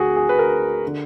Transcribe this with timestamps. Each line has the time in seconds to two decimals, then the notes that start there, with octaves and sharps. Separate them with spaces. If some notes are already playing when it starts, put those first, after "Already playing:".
Already playing: D2 D3 F#4 G#4
0.16 G#4
0.29 B4
0.39 A#4
0.87 D3